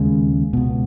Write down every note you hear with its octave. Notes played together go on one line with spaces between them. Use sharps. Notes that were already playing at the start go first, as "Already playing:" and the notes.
Already playing: D#2 C#3 G#3
C#2 B2